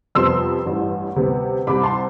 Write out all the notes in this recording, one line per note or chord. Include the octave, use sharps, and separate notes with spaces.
F2 C3 G3 B3 C6 E6
A1 G2 E3 G3
D2 C3 G3 B3
C2 C3 G3 B5 D6
A5 C6